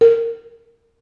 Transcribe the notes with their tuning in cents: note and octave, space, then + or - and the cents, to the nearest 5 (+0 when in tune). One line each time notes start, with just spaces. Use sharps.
A#4 -20